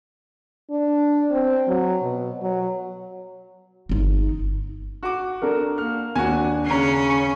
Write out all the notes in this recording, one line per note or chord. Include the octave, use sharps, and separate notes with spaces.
D4
C4
F#3
B2
F#3
G1 D#4
F#4 D6
D4 A4 A#4
A#3 F6
D#2 D4 F#4 G#5
C#3 C#4 A#5 C7